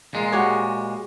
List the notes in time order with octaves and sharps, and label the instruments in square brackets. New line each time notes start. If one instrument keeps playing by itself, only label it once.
[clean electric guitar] A#2 G#3
[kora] F#4 G4 C#5